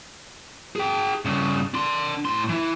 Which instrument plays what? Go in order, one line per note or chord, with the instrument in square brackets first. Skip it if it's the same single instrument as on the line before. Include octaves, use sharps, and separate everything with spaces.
[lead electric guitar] G#4 G5
G2 C#3
D4 C6
A2 C6
E3 E4